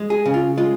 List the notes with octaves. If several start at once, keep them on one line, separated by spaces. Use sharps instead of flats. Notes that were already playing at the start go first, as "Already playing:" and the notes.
Already playing: G#3
G#4
C#3
F4
G#3 F4